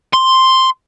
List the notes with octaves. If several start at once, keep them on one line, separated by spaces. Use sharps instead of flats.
C6